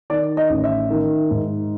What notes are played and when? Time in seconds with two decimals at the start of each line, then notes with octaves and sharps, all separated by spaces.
0.10 D#3 D5
0.37 D#5
0.50 A1
0.64 E5
0.90 D#3
1.31 G#2